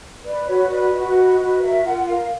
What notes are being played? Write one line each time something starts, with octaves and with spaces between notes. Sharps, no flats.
B4 D5
F#4 C#5
B4 D5
F#4 D#5
B4
F#4
A#4 E5
F4 F#5
A#4 F5